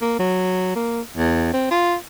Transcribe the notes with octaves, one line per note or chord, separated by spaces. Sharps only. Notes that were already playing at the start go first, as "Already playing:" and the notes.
A#3
F#3
A#3
E2
C4
F4